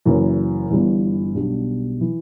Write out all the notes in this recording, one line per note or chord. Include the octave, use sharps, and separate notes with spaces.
F#1 F#2 E3
G1 G2 E3
B1 B2 G3 D4
E3